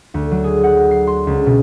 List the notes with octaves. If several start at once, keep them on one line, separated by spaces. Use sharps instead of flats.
D2
F#3
G#4
F#5
C7
C6
C#2
B2